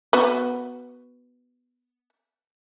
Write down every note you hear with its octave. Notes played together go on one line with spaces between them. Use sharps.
B3 F#4